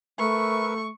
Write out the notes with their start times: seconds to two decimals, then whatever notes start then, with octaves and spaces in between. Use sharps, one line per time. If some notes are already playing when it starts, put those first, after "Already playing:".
0.19 A3 A#4 B4 E5 C#6